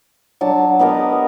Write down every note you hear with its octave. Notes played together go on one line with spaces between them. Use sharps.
F#3 D4 A5
B3 G4 A#4 D#5